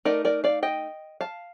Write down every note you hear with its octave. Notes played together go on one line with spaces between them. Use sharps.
A3 D#4 A#4 D5
A#4 D5
D5 F5
D#5 G5
F5 A5